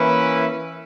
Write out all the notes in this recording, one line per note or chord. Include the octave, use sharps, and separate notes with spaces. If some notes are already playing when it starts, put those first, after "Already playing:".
Already playing: E3 A#3 C#4 E4 B4